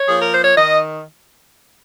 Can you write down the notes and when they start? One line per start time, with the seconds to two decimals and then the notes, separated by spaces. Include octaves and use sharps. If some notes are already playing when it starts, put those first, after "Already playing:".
Already playing: C#5
0.08 F3 A#3 G#4
0.21 A#4
0.33 C5
0.44 C#5
0.56 D#3 D#5